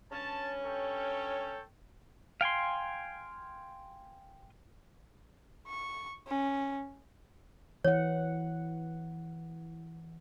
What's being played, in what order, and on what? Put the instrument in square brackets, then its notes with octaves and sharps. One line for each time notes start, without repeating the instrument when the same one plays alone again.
[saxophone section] G2 C#4 [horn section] A5
[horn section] A4 C#5 G5
[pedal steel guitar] F5 G5 G#5 C6
[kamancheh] C#6
C#4
[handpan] E3 F#5 [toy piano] C#5